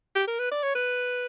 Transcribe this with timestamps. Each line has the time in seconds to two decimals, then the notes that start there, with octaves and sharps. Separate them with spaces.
0.15 G4
0.28 A#4
0.39 B4
0.51 D5
0.63 C#5
0.75 B4